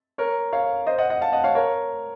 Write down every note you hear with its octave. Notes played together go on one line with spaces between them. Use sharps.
A#4 C#5
C#5 F5
C5 D#5
D#5 F#5
D#5 F#5
F5 A5
D#5 F#5
C#5 F5
A#4 C#5